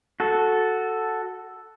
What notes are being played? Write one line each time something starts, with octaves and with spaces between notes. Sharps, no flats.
F#4 A4